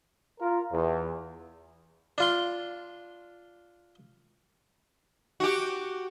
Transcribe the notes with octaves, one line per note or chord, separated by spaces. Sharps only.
F4 A#4
E2
D4 F4 C6
F#4 G4